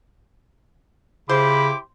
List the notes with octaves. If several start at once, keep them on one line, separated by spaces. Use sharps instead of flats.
C#3 E4 G4 C5 B5 D6